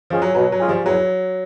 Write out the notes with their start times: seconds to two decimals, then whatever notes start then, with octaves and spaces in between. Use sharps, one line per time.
0.10 F3 G#3 C#4 F4 G#4
0.22 F#3
0.35 B2 F#3
0.52 F#3
0.60 G#3 C#4 F4 G#4
0.68 F3 G3
0.85 E2 F#3